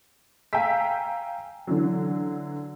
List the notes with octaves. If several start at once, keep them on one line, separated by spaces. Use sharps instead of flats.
F5 G5 G#5 A#5 E6 B6
D3 E3 F#3